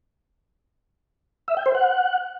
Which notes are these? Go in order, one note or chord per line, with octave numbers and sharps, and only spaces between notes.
E5
G5
C5
F#5